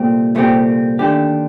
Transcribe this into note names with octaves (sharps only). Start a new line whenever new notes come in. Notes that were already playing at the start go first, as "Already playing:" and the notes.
Already playing: C2 A#2 A3 C4 G4
C2 A#2 A3 C4 G4
D#2 D3 A3 D4 G4